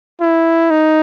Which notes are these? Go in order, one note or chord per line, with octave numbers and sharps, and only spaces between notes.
E4
D#4